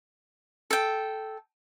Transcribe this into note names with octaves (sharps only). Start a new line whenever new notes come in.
A4 G5